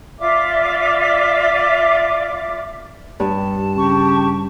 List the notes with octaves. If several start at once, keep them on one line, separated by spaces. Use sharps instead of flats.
F4 D5 E5 D6
G2 A5
C#3 G4 C#6